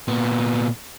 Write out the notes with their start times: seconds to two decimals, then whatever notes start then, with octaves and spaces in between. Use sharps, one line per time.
0.08 A#2 B3